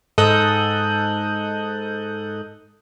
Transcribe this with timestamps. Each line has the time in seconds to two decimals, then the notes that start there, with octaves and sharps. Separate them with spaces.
0.18 G#2 A4 D#5 D#6 F#6 G6